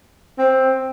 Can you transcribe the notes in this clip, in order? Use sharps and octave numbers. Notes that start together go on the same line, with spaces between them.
C4